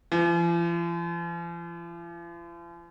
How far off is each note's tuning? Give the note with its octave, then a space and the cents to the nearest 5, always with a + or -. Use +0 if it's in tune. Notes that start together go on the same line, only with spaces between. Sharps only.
F3 -45